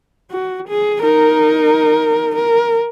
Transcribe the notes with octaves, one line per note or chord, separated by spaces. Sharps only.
F#4
G#4
D#4 A#4
A#4